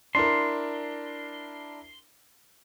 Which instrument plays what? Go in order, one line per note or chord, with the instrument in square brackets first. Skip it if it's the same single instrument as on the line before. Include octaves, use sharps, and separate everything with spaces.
[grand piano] D4 E4 A#4 [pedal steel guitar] C6